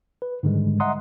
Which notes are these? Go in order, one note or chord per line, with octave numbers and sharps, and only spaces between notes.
B4
G#2 D3 D#3 G3 G#3
D#5 E5 F#5 A#5 C6 D#6